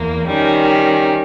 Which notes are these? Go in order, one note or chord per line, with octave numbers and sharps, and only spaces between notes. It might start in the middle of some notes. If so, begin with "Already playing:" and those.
Already playing: E2 A#3
D#3 G3 C#4